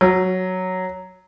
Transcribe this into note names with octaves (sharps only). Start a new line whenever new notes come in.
F#3